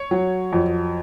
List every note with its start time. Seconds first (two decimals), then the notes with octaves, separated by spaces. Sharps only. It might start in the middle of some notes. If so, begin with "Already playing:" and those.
Already playing: C#5
0.11 F#3
0.53 F2